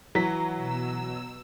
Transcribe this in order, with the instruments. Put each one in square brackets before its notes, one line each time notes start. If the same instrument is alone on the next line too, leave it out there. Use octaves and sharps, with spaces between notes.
[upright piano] E3 B6 [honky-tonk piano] F#3
[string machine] B2 E6